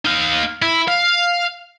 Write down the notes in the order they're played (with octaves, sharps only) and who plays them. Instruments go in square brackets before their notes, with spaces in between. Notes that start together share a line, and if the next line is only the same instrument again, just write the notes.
[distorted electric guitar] D#4 F5
E4
F5